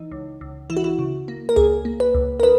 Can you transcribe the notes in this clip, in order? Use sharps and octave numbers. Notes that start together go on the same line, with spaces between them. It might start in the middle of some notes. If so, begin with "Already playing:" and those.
Already playing: E3 D#4
C#2
C#2
E3 E4
F#4
E4
C#3
A#3
A#4
C#2 G#4
A#3
B4
C#2
A#4
D#3 B4